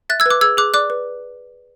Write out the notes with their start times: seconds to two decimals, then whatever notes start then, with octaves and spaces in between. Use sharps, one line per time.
0.09 E5 F#6 A6
0.20 E6 G#6
0.26 B4 D6 F#6
0.41 G#4 E6 G#6
0.57 G#4 D6 F#6
0.74 D5 D6 F#6
0.90 B4